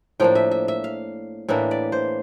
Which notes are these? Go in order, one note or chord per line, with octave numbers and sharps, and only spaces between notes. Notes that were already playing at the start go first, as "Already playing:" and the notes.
A2 F3 A#3 D4 G5
E5
E5
E5
F5
A2 E3 A#3 D4 E5
D5
C5